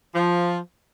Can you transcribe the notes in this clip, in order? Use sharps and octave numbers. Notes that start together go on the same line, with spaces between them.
F3